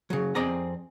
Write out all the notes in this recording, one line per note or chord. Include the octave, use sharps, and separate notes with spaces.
C#3 F#3
F2 C4 G#4 D5 D#5 A#5